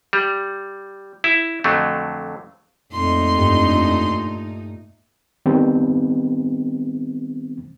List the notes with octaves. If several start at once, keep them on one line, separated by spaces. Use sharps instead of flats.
G3
E4
F2 D3 F#3 A3
F2 A#2 A3 D#4 C6
G2
D#3 G3 B3 C4